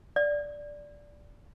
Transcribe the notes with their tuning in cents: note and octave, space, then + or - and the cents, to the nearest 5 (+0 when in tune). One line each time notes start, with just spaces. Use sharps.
D5 -5